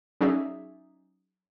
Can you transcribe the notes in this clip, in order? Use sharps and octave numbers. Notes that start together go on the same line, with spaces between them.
F#3 C#4 D#4 G#4 D5 E5